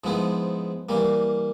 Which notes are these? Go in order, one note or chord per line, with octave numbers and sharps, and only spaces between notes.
G#2 F3 G#3 B3 E4
E3 G3 A#3